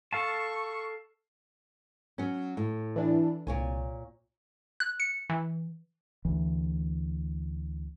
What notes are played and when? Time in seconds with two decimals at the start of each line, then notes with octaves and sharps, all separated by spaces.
0.13 A4 F5 A5 C#6
2.18 F#3 C#4
2.57 A2
2.96 E3 D4
3.47 C2 A#2 C#5 G#5
4.80 F#6
5.00 C#7
5.30 E3
6.25 D2 E3